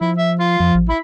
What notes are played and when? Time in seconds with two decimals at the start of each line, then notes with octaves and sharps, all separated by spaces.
0.01 F3 E4
0.18 E5
0.40 F4 C7
0.60 F2 F3
0.74 A1
0.89 E4 B5